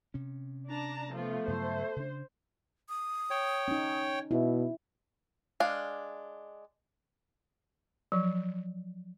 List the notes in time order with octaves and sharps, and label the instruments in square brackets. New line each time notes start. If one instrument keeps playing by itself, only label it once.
[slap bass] C3 C#4
[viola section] D4 A5 A#5
[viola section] F3 B3 F4 [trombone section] A3
[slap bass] G2 C#3 F#3 [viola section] C5
[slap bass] C#3 D4
[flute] D#6
[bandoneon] C#5 G5
[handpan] C#4 D#4
[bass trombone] B2 [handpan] E4
[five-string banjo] G#3 D4 F5
[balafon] F3 F#3